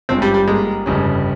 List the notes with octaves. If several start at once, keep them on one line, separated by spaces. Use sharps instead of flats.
G#1 G2 F3 G#3 C4 C#4
G3
G3
G#2 G3 G#3 A#3
G1 F2 C#3 G3 C#4